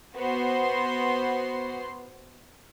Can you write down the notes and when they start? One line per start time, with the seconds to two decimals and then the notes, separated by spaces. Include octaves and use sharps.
0.15 B3 F#4 C5 C6